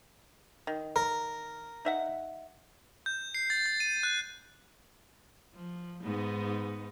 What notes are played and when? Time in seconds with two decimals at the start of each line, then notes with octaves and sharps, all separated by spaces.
0.67 D#3
0.96 A#4
1.85 D#4 E5 F#5
3.06 G6
3.35 C7
3.50 A6
3.66 A6
3.80 D#7
4.03 F#6
5.55 F3
6.04 G#2 B3 D#4